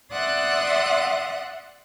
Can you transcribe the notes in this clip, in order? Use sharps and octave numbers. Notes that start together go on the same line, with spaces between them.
D5 E5 F#5 C6 D#6 F#6